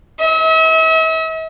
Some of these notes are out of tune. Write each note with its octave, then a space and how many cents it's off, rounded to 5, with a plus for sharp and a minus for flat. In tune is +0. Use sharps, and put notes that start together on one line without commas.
E5 -40